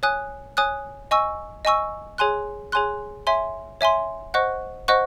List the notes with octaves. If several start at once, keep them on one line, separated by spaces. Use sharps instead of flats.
C#5 G#5 D#6 F#6
C#5 G#5 D#6 F#6
D#5 G#5 C#6 E6
D#5 G#5 C#6 E6
G#4 C#5 G#5 C6 F#6
G#4 C#5 G#5 C6 F#6
C#5 E5 G#5 C6
C#5 E5 G#5 C6
C5 D#5 F#5 C#6 F#6
C5 D#5 F#5 C#6 F#6